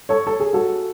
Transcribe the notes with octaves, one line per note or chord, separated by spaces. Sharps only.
A4 C#5
A4
G#4
F#4 A4